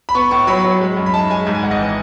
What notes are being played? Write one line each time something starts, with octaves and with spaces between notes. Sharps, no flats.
B5
B3 C#6
A2 C#6
F#3 B5
F#3
G#3
F#2
B5
D#4 A5
G#3 G#5
G#2
G#5
G#1 F#5
D#5
E3